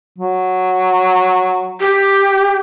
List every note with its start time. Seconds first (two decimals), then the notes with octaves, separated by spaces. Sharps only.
0.18 F#3
1.80 G4